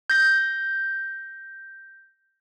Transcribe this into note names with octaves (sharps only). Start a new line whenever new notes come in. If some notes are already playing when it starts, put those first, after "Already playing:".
G6 A#6